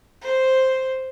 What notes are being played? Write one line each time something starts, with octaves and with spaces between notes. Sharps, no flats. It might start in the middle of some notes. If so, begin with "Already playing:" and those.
C5